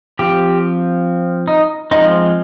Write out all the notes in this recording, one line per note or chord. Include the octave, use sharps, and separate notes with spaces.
F3 C4 G4
D#4
F3 G#3 C4 D#4